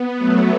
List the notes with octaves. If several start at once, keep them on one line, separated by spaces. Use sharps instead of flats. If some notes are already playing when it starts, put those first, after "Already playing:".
Already playing: B3
F#3 A3